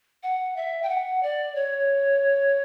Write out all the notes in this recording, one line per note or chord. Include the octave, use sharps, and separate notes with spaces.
F#5
E5
G5
F#5
D5
C#5